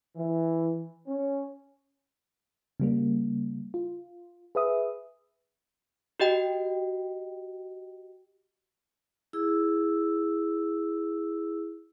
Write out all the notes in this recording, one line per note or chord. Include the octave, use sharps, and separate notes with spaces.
E3
C#4
C#3 G3 A#3
F4
G#4 B4 E5 D#6
F#4 G4 D#5 G5
E4 G#4 E6